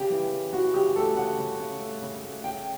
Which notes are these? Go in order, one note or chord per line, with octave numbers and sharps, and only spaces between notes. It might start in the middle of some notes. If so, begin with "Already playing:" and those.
Already playing: C#3 G4
E3
C#3
E3 F#4
C#3 G4
A3 A4
C#3 F#5
C#3
C#3
A3
C#3
A3
C#3 G5